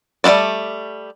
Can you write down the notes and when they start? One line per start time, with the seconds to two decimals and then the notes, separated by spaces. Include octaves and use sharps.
0.24 G3 A3 A#3 D4 D5